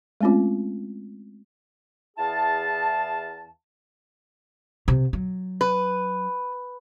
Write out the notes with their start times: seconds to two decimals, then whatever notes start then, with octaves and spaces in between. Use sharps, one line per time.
0.21 G#3 A3 C4 C#4 F4
2.17 E2 E4 G#4 F5 A5
4.88 C3
5.13 F#3
5.61 B4